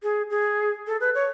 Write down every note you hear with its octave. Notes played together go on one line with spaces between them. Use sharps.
G#4
G#4
A4
B4
C#5